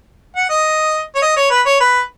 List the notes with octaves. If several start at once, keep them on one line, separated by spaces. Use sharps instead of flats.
F#5
D#5
C#5
D#5
C#5
B4
C#5
B4